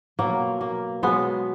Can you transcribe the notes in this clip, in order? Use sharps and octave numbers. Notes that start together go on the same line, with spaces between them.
B2 F#3 A#3
A#3
B2 F#3 G#3 B3